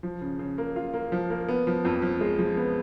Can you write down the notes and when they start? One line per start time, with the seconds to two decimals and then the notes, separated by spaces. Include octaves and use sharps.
0.03 F3
0.22 C#3
0.39 C#3
0.58 A#3
0.76 F4
0.94 A#3
1.12 F3
1.30 A#3
1.48 B3
1.67 F3
1.85 F2
2.02 F3
2.21 G#3
2.39 F3
2.57 B3